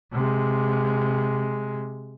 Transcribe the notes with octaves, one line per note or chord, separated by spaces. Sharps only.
C3 G#3